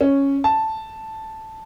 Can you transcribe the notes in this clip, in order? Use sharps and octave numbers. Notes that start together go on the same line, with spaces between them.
C#4
A5